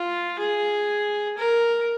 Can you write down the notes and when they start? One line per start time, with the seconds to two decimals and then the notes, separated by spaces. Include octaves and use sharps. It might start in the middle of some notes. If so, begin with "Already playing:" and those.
Already playing: F4
0.38 G#4
1.38 A#4